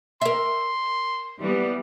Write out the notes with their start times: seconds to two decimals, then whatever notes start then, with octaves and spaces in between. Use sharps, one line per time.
0.22 A#4 E5 C6
1.41 E3 G3 B3